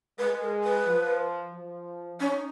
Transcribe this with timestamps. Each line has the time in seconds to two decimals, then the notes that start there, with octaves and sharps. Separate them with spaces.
0.19 G#3 B4
0.41 A#4
0.64 B4
0.86 F3
1.53 F3
2.20 C#4 D#4